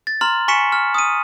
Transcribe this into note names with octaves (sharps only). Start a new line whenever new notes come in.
A6
A#5 C6 F6 F#7
G#5 C#6 B6 C#7 E7
F6
D#6 D#7